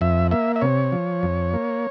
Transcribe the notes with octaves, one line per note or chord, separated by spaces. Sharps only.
F2 E5
A#3 E5
E5
C3 C#5
F3
F2
A#3